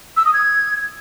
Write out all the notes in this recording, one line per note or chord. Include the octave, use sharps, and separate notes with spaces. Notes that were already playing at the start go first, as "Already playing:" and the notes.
E6
D#6
G#6